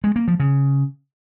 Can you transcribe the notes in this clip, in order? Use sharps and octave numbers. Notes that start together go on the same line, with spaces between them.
G#3
A#3
F3
C#3